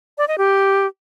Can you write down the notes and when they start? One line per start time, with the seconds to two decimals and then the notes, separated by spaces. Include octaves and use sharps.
0.18 D5
0.28 D#5
0.38 G4